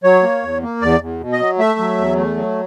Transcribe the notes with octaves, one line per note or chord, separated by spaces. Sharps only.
F#3 C#5
A#3
E2
A#3
E2 D5
E2
B2
D#5
F#3
A3 E5
F#3
E2
A3
F#3